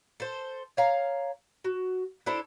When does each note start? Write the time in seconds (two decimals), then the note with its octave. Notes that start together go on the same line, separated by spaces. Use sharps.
0.20 A4 C5
0.77 C#5 F5 A#5
1.64 F#4
2.26 D4 E4 A4 C5